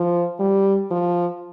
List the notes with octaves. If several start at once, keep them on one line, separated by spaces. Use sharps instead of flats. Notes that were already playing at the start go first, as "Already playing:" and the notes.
Already playing: F3
G3
F3